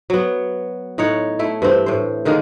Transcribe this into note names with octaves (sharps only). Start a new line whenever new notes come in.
F#3 B3
A2 D#4 C#5 F#5
A3 E4
G2 E3 C4
A2 C5
D3 D#3 G#3 A#3